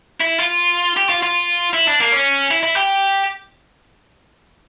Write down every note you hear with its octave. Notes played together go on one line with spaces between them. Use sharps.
E4
F4
G4
F4
F4
E4
D4
A#3
C#4
E4
E4
G4